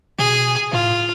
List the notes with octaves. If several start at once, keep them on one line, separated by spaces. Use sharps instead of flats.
B2 G#4
A2 F4